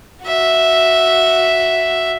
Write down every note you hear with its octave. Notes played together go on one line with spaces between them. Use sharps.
F#4 E5